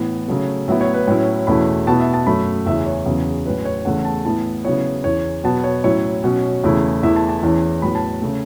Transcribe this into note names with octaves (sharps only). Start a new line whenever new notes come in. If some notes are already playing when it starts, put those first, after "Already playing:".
Already playing: A2 E3 B3
C#3 F#3 A3
A2 F#3 B3 E4 E5
C#5
B4
A2 F#3 C#4 E4 C#5
E2 B2 A3 C#4 E4 B5
B2 B3 E4 A5
E5
A5
F#2 F#3 A3 B5
E2 C#3 E3 C#4 E5
C#5
E2 C#3 F#3 B3
A2 F#3 C#4 E4 B4
C#5
E2 C#3 A3 E4 F#5
A5
A2 E3 B3 E4 A5
C#3 F#3 B3 E4 C#5
E2 E3 C#4 C#5
B2 F#3 B3 A5
C#5
A2 F#3 C#4 E4 C#5
B2 F#3 C#4
E2 C#3 A3 E4
E2 E3 A3 E4 E5
A5
A5
E2 E3 C#4 E4
A2 F#3 B3 B5
A5
C#3 A3